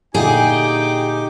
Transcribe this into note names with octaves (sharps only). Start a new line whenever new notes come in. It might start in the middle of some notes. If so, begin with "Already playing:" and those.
A#2 D3 D#4 E4 G4 G#4 G5 D6